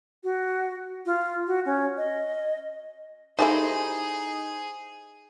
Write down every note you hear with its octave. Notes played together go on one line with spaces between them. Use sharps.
F#4
F4
F#4
C#4
D#5
G3 A3 D#4 E4 G#4 C5 G#5